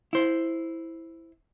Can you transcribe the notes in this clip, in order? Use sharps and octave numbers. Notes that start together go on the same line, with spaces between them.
E4 C5